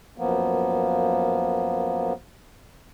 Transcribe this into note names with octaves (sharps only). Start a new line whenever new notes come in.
F#2 F3 A#3 B3